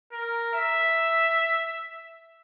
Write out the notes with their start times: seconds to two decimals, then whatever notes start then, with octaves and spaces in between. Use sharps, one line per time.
0.13 A#4
0.54 E5